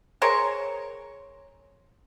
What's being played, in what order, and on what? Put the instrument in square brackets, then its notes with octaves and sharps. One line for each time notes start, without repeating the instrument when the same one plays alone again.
[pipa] G#4 A#4 C5 C#5